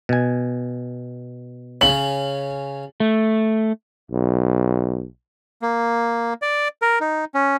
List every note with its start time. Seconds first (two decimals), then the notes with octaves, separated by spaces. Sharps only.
0.09 B2 G#5
1.81 C#3 C#4 F#7
3.00 A3
4.11 B1
5.62 A#3
6.42 D5
6.82 A#4
7.01 D#4
7.34 C#4